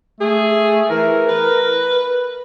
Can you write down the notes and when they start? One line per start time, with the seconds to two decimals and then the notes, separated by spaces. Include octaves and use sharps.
0.21 A3 G#4
0.90 E3 A#4
1.29 B4